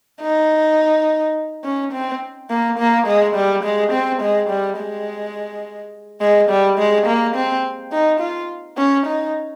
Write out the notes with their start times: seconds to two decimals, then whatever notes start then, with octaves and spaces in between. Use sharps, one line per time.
0.21 D#4
1.64 C#4
1.93 C4
2.50 A#3
2.79 A#3
3.07 G#3
3.35 G3
3.64 G#3
3.92 C4
4.22 G#3
4.49 G3
4.79 G#3
6.21 G#3
6.49 G3
6.78 G#3
7.06 A#3
7.35 C4
7.92 D#4
8.20 F4
8.77 C#4
9.06 D#4